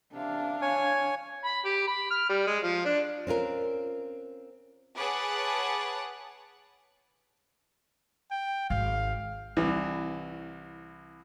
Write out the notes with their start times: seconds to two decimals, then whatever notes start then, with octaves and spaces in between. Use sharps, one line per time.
0.13 C3 D4 F5
0.62 C#5 G#5
1.45 B5
1.65 G4
1.88 B5
2.11 F6
2.30 G3
2.47 G#3
2.63 F3
2.85 D4
3.27 C4 C#4 F4 A#4
4.97 G#4 B4 C#5 F#5 A5 D6
8.31 G5
8.70 G#1 F5
9.57 C2 E3